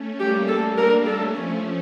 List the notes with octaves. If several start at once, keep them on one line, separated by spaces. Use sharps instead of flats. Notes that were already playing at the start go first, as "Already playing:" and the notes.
Already playing: A3 C#4
G3 A#3 G4
A4
A#3 D4 A#4
A3 C#4 A4
F3 A3 C#4